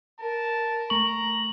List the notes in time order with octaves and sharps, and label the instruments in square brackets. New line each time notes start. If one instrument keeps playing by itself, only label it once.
[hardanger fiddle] A#4 [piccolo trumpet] A5
[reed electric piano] A3 C#6 [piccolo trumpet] A#5 [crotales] F#7